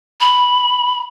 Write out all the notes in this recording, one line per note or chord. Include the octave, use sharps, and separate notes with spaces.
B5